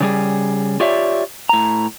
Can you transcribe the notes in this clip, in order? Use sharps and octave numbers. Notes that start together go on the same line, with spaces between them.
C#3 G3 G#4
F4 G4 C#5 D5 E5
A2 A#5